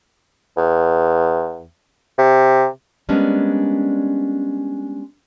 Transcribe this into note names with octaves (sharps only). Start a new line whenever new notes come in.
E2
C3
G3 G#3 A#3 B3 C#4 D4